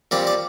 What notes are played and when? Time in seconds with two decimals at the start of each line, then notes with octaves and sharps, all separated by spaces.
0.11 A#2 G3 C4 D5
0.27 D5